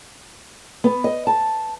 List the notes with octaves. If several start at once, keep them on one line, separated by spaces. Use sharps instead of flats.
B3
D#5
A5